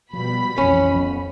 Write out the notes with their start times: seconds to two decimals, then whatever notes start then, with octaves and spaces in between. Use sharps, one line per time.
0.13 B2 F3 G3 B5
0.58 A#1 F2 E3 C#4
0.94 D#1 F3 B3